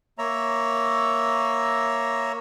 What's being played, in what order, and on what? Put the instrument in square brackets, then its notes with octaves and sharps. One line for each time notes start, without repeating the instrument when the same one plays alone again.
[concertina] A#3 C#5 E5 A#5